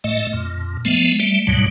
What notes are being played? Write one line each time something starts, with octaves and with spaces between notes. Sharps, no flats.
A2 A3 D#5
F2 A#2
F3 G#3 A3 B3
G3 A3
D2 G#2 B2 F#3 G3